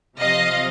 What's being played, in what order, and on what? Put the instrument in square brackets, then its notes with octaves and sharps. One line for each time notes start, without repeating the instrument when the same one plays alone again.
[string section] C3 F3 D#5 F5